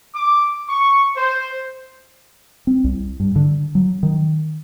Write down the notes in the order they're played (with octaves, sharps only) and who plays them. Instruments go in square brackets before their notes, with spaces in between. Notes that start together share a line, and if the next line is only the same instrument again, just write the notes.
[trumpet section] D6
C#6
C5
[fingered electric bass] C4
C2
G2
D3
F#3
D#3